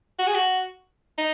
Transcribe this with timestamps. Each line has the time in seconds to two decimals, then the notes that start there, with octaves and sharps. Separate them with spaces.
0.19 F#4
0.27 G#4
0.35 F#4
1.18 D#4